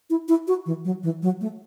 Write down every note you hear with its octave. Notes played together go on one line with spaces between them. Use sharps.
E4
E4
F#4
E3
F#3
E3
F#3
A3